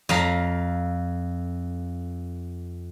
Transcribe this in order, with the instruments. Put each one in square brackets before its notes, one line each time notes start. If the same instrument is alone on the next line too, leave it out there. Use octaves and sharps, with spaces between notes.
[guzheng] F2 F5 A#5